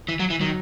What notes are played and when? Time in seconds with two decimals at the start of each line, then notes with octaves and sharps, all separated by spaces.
0.08 E3
0.20 F#3
0.30 E3
0.40 D#3 F#3